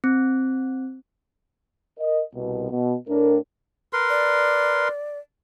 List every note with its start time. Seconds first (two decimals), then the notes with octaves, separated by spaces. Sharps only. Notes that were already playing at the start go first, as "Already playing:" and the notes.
0.04 C4
1.99 A#4 D#5
2.34 C2 B2
2.71 B2
3.08 A2 D4 A#4
3.93 A#4 B4 C6
4.09 D5